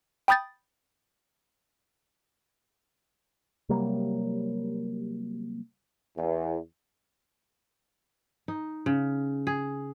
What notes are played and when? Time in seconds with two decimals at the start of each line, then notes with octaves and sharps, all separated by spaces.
0.28 G5 B5 D#6 G6 A6
3.69 C3 F#3 G3 A#3
6.18 E2
8.48 D#4
8.86 C#3
9.47 G#4